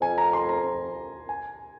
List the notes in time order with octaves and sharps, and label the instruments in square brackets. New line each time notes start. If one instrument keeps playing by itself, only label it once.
[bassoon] F2 [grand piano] G#5
[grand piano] A#5
C6
A#5
G#5